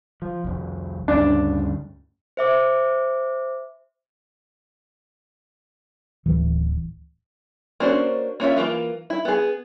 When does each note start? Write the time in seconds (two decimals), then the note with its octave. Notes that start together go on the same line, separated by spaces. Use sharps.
0.22 F3
0.44 C2 F2
1.08 D2 G2 C#3 D4
2.37 C5 E5 D6
6.26 D1 E3
7.80 A#3 C#4 D4 F#4 C5
8.40 A#3 C#4 F4 E5
8.56 E3 F#3 A#3 F4
9.10 E4
9.25 B3 G#4